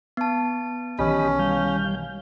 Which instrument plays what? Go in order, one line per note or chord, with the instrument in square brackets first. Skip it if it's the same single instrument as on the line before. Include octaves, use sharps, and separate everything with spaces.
[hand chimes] B3 A5
[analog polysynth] B1 D#3 E3 [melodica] C#4 [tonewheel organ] G4 D#5 B5
[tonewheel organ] G3 F5 G6